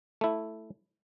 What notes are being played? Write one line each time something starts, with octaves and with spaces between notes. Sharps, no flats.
A3 E4